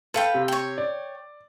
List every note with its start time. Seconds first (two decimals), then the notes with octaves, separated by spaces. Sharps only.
0.14 A4 B4 F5 G5
0.34 C3
0.48 C#5 G5
0.78 D5